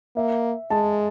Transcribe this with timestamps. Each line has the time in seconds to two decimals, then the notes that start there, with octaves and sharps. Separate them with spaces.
0.16 A#3 E5
0.70 G#3 A5